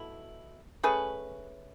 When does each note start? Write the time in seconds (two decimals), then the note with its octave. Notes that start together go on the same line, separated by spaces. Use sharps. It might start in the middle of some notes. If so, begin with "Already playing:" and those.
Already playing: B2 A3 E4
0.83 A3 C#4 G#4 B4